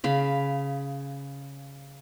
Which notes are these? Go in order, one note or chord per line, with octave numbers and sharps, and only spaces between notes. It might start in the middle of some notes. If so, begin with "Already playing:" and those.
C#3 F5 B5